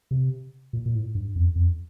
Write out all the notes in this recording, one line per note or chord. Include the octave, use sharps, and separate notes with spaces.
C3
A#2
A#2
A2
G2
F2
F2